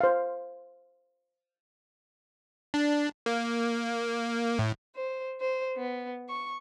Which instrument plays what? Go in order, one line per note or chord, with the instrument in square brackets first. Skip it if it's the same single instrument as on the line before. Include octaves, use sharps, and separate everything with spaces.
[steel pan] C5 F5
[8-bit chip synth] D4
A#3
A2
[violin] C5
C5
B3
C#6